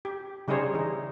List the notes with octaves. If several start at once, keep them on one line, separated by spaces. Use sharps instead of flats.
G4
C#3 G3 D#4 G#4 C5 C#5
E3 D#4